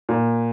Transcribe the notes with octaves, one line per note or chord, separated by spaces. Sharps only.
A#2